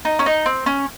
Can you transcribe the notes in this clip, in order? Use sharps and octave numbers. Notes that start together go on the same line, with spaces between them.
D#4
C#4
D#4
C4
C#4